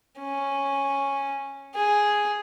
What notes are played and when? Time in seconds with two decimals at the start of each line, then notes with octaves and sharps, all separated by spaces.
0.20 C#4
1.75 G#4